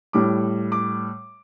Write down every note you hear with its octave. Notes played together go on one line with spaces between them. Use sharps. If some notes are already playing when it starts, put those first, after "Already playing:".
A2 G3 D6
D6